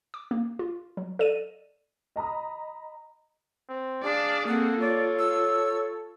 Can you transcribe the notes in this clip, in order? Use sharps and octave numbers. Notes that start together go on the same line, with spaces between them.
D6
A#3
F4
F#3
A4 D5 D#5 D#7
D#5 A#5 B5 D#6
C4
D4 G#4 D5 F5
A#3 C4 A4 F#5
F4 C#5 D5
E6